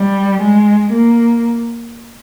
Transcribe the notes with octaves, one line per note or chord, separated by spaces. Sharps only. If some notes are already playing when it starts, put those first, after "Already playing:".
Already playing: G3
G#3
A#3